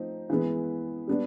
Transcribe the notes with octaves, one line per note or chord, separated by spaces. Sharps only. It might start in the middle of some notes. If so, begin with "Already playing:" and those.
Already playing: F3 A3 C4 D#4
E3 G#3 B3
G3 B3 D4